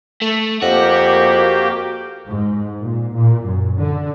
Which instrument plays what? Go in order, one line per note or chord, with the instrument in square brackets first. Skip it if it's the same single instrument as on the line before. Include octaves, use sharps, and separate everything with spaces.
[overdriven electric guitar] A3
[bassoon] F2 [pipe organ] A#3 G4 [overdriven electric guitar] F#4
[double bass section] G#2
A#2
A#2
F#2
D3